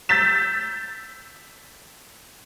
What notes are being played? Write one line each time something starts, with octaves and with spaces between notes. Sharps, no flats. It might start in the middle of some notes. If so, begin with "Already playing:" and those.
E6 G6 A6 B6 E7